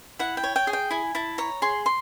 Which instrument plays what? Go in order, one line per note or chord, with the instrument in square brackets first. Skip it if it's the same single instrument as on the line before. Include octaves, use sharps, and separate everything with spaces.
[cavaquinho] E4 F#5
G5
C#5
G5
G#4
G5
E4 G#5
E4 A5
C#5 A#5
G#4 C6
C6